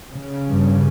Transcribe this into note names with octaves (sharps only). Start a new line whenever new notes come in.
C#3
G2